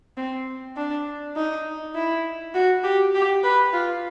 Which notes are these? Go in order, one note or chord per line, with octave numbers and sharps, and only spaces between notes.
C4
D4
D#4
E4
F#4
G4
G4
B4
F4